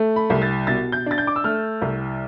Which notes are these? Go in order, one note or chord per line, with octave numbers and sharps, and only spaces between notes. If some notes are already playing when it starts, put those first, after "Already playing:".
Already playing: A3
B5
C2
A6
B2 A6
G6
D4 A6
G6
D6
E6
A3 F6
C2